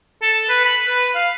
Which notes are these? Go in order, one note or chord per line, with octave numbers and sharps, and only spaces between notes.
A4
B4
B5
B4
F5